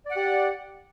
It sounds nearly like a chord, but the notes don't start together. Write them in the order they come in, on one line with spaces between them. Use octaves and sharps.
D5 F#5 G4